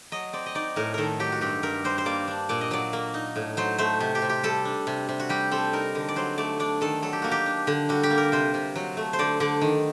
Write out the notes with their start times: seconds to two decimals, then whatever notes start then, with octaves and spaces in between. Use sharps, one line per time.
0.12 F#3 D#5
0.33 C4 D5
0.46 D#5
0.55 D#4 D5
0.76 A2 A#4
0.94 D#3 A4 A#4
1.19 F#3 G4
1.32 F#4
1.41 G2 G4
1.63 G2 A#4
1.85 G3 C5
1.98 C5
2.06 A#3 D5
2.28 D4
2.49 A#2 D5
2.61 D#5
2.71 F#3 D5
2.93 A#3
3.14 D#4
3.36 A2
3.57 F#3 C5
3.78 A3 C5
4.00 C3
4.15 G4
4.22 C3
4.29 G4
4.43 G3 A4
4.65 D4
4.87 C3
5.09 C3
5.20 F#4
5.29 G3 G4
5.51 C4 A4
5.73 D#4 A#4
5.95 D3
6.09 D5
6.16 F#3 C5
6.38 A3 D5
6.59 D4 D5
6.81 D#3 A4
7.02 F#3 A4
7.13 G4
7.22 A#3 F#4
7.31 G4
7.46 D4
7.67 D3
7.89 G3 F#4
8.03 G4
8.10 A#3
8.18 A#4
8.32 C3 C5
8.54 C3
8.76 F#3
8.97 A3
9.13 C5
9.19 D3 D5
9.40 D3 D5
9.61 D#3